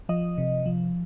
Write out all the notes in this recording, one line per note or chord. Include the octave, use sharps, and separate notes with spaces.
F3 D#5
C3
F3